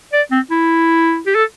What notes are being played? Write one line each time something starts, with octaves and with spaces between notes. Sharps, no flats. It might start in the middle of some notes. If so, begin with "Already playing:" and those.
D5
C4
E4
G4
A4